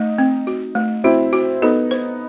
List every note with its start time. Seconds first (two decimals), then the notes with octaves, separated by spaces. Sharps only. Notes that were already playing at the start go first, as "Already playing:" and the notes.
Already playing: A3 D#4
0.18 C4
0.47 F#4
0.75 A3
1.04 C4 E4 F#4
1.33 F#4
1.62 B3 D#4 A4
1.91 C5